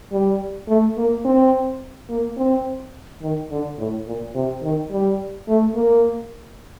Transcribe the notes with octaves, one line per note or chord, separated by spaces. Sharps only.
G3
A3
A#3
C4
A#3
C4
D#3
D3
A2
A#2
C3
D#3
G3
A3
A#3